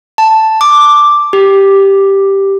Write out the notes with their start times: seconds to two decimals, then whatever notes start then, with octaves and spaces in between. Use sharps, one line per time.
0.18 A5
0.61 D6
1.33 G4